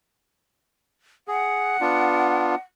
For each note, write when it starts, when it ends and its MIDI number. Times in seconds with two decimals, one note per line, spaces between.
1.28 1.77 68
1.28 2.56 78
1.81 2.55 59
1.81 2.55 62
1.81 2.55 65